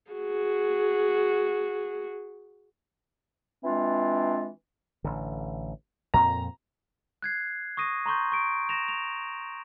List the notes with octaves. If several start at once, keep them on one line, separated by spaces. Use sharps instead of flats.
F#4 G#4
E3 G#3 C4 D4 F4
A1 D3
F2 A#2 C4 A#5
F#6 G#6 C7
C#6 D#6 A#6 D#7
A#5 C6 C#6 G6
C#6 D7
A#6 E7 F7
F7